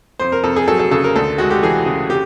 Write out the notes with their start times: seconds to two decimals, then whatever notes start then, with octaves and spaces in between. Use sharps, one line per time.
0.19 F2 C5
0.32 A#4
0.44 F2 A4
0.56 G#4
0.68 F#3 A4
0.79 A4
0.91 C#3 A4
1.04 A#4
1.16 D2 A4
1.38 G#3 F#4
1.50 G4
1.62 E3 G#4
1.86 C#3
2.10 G4